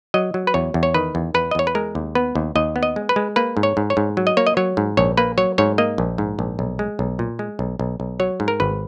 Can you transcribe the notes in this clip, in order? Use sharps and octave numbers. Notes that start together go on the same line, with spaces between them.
F#3 D#5
F#3
B4
E2 C#5
E2
C#5
D#3 B4
E2
E2 B4
D#5
E2 C#5
B4
G#3 A#4
D#2
B3 B4
D#2
D#2 D#5
B3
D#5
G#3
B4
G#3
A#3 B4
G#2
C#5
G#2
C#5
G#2
F#3
D#5
A#3 C#5
D#5
F#3 C#5
G#2
A#1 C#5
A#3 B4
F#3 C#5
G#2 C#5
A#3 D#5
A#1
G#2
A#1
B1
G#3
B1
A#2
G#3
B1
B1
B1
F#3 C#5
G#2
A#4
G#1 B4